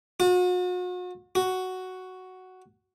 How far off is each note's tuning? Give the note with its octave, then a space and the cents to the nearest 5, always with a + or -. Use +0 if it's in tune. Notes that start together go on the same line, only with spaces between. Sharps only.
F#4 -40
F#4 +5